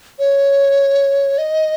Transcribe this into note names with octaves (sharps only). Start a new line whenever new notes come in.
C#5
D#5